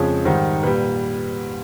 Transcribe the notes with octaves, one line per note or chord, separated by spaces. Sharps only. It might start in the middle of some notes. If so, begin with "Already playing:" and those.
Already playing: F2 C#3 F3 G#3 C#5
G#2 D#3 G3 C5
A#2 G3 B4